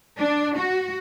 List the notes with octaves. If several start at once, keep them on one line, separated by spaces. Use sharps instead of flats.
D4
F#4